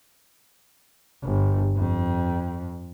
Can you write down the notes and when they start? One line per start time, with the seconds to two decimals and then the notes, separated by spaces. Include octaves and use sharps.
1.23 G1
1.77 F2